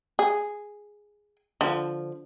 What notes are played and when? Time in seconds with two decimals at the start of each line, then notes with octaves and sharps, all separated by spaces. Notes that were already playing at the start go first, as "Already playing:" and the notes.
0.19 G#4
1.61 D3 F3